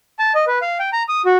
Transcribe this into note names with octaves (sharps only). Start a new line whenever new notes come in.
A5
D#5
B4
F5
G5
A#5
D#6
F#4